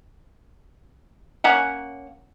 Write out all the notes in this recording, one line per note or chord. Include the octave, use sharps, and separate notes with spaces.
A#3 C#4 F#5